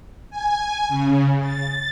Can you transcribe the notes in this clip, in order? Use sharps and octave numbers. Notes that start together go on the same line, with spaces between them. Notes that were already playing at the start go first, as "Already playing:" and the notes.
G#5
C#3
A6